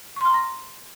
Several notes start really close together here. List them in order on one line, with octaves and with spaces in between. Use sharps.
C#6 C6 F6 A#5 A#6